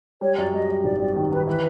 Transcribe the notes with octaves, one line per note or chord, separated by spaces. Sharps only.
G3 C#5
F#2 D5
G3 D#5
G3
G#1 D5
G3 D5
D#3
D#3 B4
E3 B4